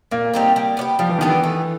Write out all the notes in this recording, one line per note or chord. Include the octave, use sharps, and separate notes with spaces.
A#2 A#3
G3 C4 D#4
G3
B3 D4 G4
F3 G3
E3
D#3 B3 D4 G4
E3
A3